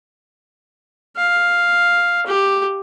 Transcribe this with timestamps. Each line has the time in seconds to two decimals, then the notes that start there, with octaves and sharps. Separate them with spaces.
1.17 F5
2.27 G4